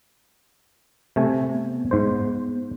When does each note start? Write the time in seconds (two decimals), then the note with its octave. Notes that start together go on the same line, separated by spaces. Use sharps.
1.16 C3 A3 G#5
1.53 B3
1.91 G#2 C5